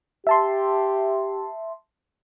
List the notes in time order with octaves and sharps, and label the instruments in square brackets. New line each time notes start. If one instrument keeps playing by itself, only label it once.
[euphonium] G4 [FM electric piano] E5 A5 C6